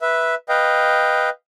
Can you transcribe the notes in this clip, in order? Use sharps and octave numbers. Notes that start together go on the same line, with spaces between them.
B4 E5
B4 D#5 F5 G5